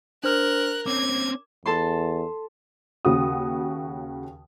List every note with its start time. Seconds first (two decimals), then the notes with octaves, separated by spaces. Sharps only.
0.24 D4 A#4 C5 F6 F#6
0.86 C4 C#4 D6 G#6
1.66 E2 A4 A5 C6
3.05 D#2 C#3 F#4 D#6